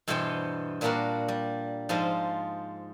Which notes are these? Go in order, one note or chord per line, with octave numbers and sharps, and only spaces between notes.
G2 B2 E3 B3 C5 G5
A#2 G3 A#3 D4 F#4 A#4
G3
G#2 F3 F4 C5 D#5